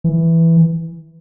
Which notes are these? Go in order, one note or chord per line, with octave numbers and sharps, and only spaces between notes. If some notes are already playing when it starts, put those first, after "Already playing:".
E3